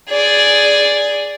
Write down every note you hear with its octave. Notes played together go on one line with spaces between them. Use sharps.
G#4 D5